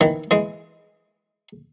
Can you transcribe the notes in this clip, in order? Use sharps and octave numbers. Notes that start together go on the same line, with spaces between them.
D#3 E3
E3 G#3